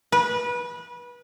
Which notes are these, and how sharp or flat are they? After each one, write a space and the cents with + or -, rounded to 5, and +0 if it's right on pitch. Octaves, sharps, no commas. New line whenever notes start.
B4 -25